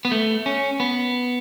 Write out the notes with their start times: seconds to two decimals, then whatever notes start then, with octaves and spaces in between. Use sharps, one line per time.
0.05 B3
0.11 A3
0.46 C#4
0.80 B3